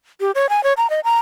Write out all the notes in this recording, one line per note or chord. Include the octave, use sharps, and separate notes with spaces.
G4
C#5
G#5
C#5
A#5
D#5
A#5